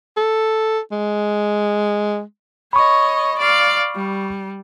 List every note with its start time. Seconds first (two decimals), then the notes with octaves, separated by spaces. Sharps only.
0.17 A4
0.92 G#3
2.73 C#5 D#5 B5 C#6
3.38 D5 F5
3.95 G3